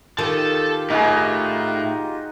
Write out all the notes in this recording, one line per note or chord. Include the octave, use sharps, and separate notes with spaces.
D#3 F4 G4 A4 A5
A2 D#4 F#4 G#4